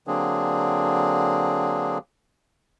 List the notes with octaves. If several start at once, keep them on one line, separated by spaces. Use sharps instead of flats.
D3 F#3 A#3 C4 D4 G#4